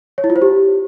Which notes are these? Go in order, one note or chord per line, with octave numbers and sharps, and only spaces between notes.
C#5
E4
F4
C5
G4